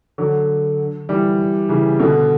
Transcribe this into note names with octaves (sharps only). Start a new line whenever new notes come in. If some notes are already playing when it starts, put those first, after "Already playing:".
D3 F#3
E3 G3
C#3 E3
B2 D3